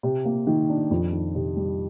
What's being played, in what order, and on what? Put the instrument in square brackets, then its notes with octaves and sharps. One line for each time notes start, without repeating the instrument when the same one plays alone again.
[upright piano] C3
A#3
D#3
D4
F2
D#3
C3
G3